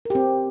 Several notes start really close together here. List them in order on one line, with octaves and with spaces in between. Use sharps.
A#4 G4 C4